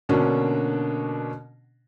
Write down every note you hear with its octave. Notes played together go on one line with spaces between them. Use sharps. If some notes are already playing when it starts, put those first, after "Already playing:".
B2 D3 A#3 C#4 D4